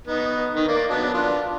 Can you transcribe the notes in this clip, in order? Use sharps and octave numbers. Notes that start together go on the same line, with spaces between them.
B3 D#4
D#3
A#3 D5
F#3 B3 D4
D4 F4